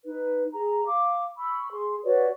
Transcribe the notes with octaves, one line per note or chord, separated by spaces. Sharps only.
D#4 B4
G#4 A#5
F5 D6
B5 C#6 E6
G#4 C6
F#4 B4 C#5 D5